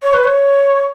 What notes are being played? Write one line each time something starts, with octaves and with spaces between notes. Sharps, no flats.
C#5
B4
C#5